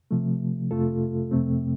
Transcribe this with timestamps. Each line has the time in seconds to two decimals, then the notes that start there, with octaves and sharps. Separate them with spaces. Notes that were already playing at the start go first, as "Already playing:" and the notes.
0.11 C3 F3 A3
0.71 F2 C3 A3 F4 A4
1.31 F2 C3 A3 C4